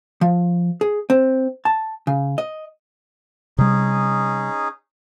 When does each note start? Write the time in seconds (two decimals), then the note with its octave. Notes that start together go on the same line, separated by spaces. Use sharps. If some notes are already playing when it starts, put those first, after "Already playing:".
0.21 F3
0.81 G#4
1.10 C4
1.65 A5
2.07 C#3
2.38 D#5
3.58 C3 G3 C#4 D#4 G#4